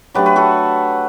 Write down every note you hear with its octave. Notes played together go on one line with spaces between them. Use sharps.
F#3 A3 D4 G4 B4
B4
F#4 A4